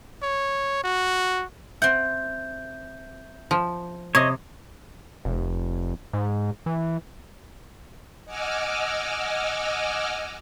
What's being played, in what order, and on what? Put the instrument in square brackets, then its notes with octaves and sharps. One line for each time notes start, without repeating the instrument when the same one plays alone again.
[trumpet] C#5
F#4
[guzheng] C4 F#5 [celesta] E5 G6
[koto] F3
[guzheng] C3 [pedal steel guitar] C#5 D#5
[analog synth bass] F1
G#2
E3
[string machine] D#5 F#5 G#5 D6 E6 F6